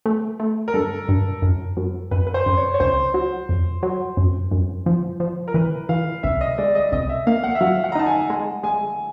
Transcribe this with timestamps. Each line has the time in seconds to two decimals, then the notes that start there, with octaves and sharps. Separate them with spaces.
0.06 A3
0.40 A3
0.68 A#4
0.74 G2 A4
1.08 G2
1.42 F#2
1.77 F#2
2.11 F#2 B4
2.27 B4
2.34 C5
2.46 F#2
2.57 C#5
2.74 C#5
2.80 C#2 C5
3.14 F#3
3.49 F2
3.83 F#3
4.17 F#2
4.51 F#2
4.86 F3
5.20 F3
5.48 A#4
5.54 E3 B4
5.89 E3 F5
6.23 C2 E5
6.41 D#5
6.58 G#3 D5
6.75 D#5
6.92 C2 D#5
7.09 E5
7.27 A#3 F5
7.43 F#5
7.55 E5
7.61 F#3 F5
7.84 F#5
7.92 A#5
7.95 D#4 A5
8.06 G#5
8.30 G#3
8.63 G#3 G#5